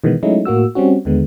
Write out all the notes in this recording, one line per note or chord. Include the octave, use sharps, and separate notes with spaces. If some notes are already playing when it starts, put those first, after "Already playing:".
B2 D#3 E3 G#3 B3
F#3 G#3 A3 C#4 D#4 E4
A2 A#3 F#4 E6
G3 C4 C#4 F#4
D#2 D3 G#3 B3